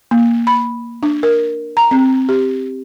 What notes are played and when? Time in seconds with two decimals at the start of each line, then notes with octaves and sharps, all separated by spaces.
0.11 A#3
0.47 B5
1.03 D4
1.23 A#4
1.77 A#5
1.91 C4
2.29 G4